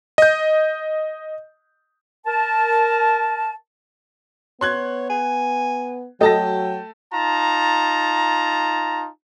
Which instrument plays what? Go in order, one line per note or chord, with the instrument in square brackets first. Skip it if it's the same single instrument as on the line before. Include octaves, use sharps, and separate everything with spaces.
[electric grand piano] D#5 G6
[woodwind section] A#4 A5
[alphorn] B3 [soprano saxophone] C#5 [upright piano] C6 F#6 G#6
[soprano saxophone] G#5
[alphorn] F#3 [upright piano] A3 A5 A#6 [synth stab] F#4 A4 D#5 [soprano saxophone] G5
[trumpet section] D#4 F4 A5 A#5